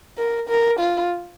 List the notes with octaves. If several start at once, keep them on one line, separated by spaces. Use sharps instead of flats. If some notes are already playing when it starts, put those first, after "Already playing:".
A#4
A#4
F4